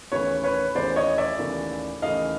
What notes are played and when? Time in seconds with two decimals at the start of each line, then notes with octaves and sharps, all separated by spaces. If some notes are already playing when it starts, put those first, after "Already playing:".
0.12 D#2 C#3 E3 A3 B4 C#5
0.44 B4 C#5
0.75 D#2 C#3 E3 A3 C5 D5
0.96 C#5 D#5
1.18 D5 E5
1.39 D#2 C#3 E3 A3
2.02 D#2 C#3 E3 A3 D#5 F5